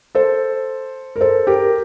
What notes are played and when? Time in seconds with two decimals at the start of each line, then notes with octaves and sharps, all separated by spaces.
0.15 A4 C5
1.16 A#4
1.21 A4 C5
1.47 G4 A#4